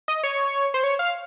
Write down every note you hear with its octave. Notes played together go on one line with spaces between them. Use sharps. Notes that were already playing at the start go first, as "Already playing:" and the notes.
D#5
C#5
C5
C#5
F5